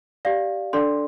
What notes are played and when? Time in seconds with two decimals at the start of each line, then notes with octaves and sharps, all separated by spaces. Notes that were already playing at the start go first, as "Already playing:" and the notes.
0.25 G4 D5 F5
0.73 D4 A4 D5 C6